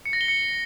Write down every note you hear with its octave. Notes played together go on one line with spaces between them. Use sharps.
C#7
A#6
G7
C#7